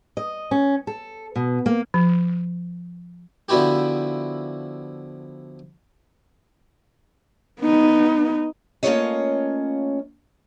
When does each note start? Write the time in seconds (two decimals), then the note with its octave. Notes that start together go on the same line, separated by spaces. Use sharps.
0.17 D#5
0.51 C#4
0.87 A4
1.36 B2
1.66 A#3
1.94 F3
3.49 D3 F3 B3 E4 F#4 G4
7.62 B3 D#4
8.83 A3 A#3 C#4 F4 C#5 D#5